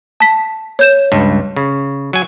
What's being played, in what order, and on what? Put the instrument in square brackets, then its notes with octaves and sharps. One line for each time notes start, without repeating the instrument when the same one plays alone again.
[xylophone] A5 B6
C#5 G6 E7
[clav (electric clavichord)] C#2 G2
C#3
F#3 G#5